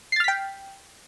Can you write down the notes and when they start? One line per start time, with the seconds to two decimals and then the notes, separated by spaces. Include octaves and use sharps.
0.12 C7
0.16 A6
0.20 F6
0.24 B6
0.28 G5